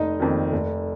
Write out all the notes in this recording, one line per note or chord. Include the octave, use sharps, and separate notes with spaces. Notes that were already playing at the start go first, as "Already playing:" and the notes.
Already playing: F1 D#4 D#5
F2 D#3
F1